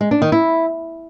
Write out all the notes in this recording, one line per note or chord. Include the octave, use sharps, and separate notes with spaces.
G#3
D4
D#3
E4